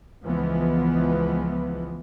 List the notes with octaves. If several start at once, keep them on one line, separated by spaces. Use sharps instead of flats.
C#2 E3 F3 G#3 B3